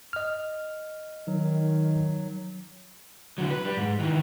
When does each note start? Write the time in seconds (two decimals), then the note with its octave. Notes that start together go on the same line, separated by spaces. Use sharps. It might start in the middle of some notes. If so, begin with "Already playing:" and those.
0.13 D#5 F6
1.28 D#3 F#3
3.38 D3 F#3
3.50 B4
3.65 G3
3.77 G#2
3.99 D#3 E3